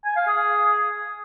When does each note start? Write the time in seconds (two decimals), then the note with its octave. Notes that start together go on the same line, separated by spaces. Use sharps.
0.05 G#5
0.16 F5
0.28 G#4